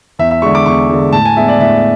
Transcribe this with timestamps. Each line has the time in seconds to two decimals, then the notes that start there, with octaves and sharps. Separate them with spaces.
0.19 E2 E5
0.31 E5
0.42 D3 G#3 C#6
0.55 D6
0.66 E2 C#6
0.90 D3 G#3
1.13 A2 A5
1.25 G#5
1.37 G#3 B3 D4 E5
1.48 D5
1.60 A2 E5